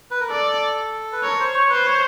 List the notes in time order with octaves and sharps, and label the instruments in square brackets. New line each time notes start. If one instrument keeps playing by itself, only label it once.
[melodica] B4
A#4
[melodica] A4 [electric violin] D5
[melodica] B4
[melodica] A#4 [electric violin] C#5
[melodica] C5
C#5
[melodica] B4 [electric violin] C5
[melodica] C#5